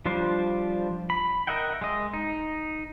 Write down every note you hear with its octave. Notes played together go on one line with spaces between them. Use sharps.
F3 G3 D4 F4 C5
B5
A#4 D#5 E5 F#5 G5
G#3 D#5
D#4